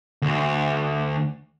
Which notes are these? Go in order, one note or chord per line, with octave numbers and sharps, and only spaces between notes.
D2